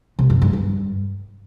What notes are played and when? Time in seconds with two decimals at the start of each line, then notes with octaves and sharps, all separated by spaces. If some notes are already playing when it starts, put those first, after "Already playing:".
0.19 C3
0.30 F#2
0.42 G2
0.53 G2